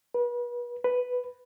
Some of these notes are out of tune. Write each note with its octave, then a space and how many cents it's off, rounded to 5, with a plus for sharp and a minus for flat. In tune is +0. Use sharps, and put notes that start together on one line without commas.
B4 -35
B4 +5